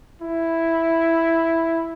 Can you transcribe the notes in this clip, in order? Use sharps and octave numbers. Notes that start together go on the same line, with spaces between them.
E4